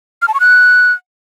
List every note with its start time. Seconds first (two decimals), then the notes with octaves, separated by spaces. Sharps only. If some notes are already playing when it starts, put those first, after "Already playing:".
0.22 F6
0.28 A5
0.34 C#6
0.40 F#6